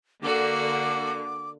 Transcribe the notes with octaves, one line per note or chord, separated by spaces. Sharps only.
D3 A#3 F#4 D6